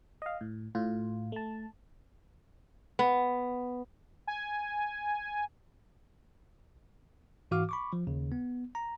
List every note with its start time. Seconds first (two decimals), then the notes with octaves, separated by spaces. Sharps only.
0.22 D#5 F5
0.41 A2
0.75 A2 F4
1.32 A3 A5
2.99 B3
4.27 G#5
7.51 G#2 E3 F#4 F5 D6 F6
7.69 B5 C#6 D6
7.93 F3
8.07 D#2 C#3
8.32 B3
8.75 A#5